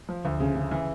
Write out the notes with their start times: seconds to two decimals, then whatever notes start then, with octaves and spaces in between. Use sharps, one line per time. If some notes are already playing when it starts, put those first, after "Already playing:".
0.09 F3
0.25 D2
0.40 C#3
0.55 C#3
0.71 E3